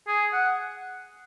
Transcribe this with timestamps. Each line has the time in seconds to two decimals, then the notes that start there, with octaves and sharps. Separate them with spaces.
0.08 G#4
0.33 F#5